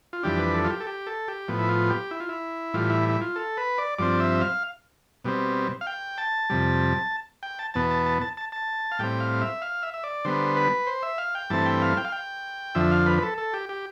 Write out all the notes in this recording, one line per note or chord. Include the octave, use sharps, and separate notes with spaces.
F4
F2 E3 G3 D4 G4
B4
A4
F4
G4
A4
G4
A4
G4
A2 F3 B3
E4
F4
G4
E4
F4
E4
A2 E3 G3 F4
E4
E4
F4
A4
B4
D5
G2 F3 C4 D5
E5
F5
B2 G3 C4
F5
G5
A5
F2 C3 G3
G5
A5
E2 B2 B3 A5
A5
A5
A5
A5
A5
F5
A2 G3 C4 G5
F5
E5
F5
E5
E5
D5
D3 G3 B3 C5
B4
C5
E5
F5
G5
G2 E3 A3 C4 A5
G5
F5
G5
F5
G5
F2 D3 F3 E5
F5
B4
B4
A4
A4
G4
G4